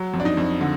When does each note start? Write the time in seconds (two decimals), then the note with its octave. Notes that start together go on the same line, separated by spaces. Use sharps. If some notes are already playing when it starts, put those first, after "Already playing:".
Already playing: F#3
0.13 F2
0.20 D4
0.25 D#4
0.37 F2
0.61 D3